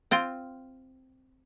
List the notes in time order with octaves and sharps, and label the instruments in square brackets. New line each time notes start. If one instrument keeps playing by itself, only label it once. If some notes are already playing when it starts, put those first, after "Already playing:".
[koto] C4 F4 G5